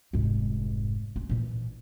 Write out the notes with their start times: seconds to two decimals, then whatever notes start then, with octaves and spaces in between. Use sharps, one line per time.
0.13 F1 G#2
1.16 C#4
1.29 A#2 E3